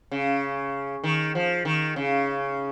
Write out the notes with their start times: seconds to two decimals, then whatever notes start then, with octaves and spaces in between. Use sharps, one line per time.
0.11 C#3
1.04 D#3
1.35 F3
1.65 D#3
1.96 C#3